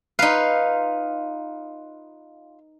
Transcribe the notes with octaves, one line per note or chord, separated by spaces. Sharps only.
D#4 F4 B4 F5